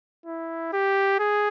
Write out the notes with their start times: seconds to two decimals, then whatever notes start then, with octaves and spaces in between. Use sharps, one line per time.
0.26 E4
0.73 G4
1.19 G#4